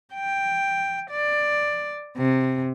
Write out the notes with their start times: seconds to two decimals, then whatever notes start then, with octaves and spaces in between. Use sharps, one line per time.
0.14 G5
1.10 D5
2.17 C3